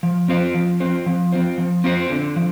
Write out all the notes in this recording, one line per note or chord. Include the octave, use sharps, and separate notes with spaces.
F3
C4 F4 C5
F3
C4 F4 C5
F3
C4 F4 C5
F3
C4 F4 C5
D3
F3